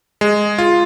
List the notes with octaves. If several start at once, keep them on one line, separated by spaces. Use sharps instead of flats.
G#3
F4